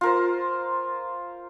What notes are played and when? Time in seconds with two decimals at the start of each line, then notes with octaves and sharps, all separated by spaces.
0.01 F4 A#4 C5